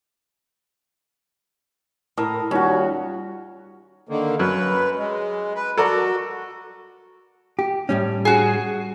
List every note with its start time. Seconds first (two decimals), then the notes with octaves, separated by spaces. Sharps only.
2.17 A2 A#4 D#6
2.51 D#2 G3 C#4 F4 F#4
4.09 D3 D#3 A#3
4.39 F#2 B4
4.97 G#3
5.55 B4
5.78 F#4 A4 A#4 D5
7.59 G4
7.89 A2 G3 C#4
8.25 F#4 G#4